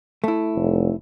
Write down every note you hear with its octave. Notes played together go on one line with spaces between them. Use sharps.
A3 E4
F1